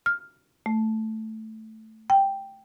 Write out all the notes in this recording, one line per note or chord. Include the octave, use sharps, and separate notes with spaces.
F6
A3
G5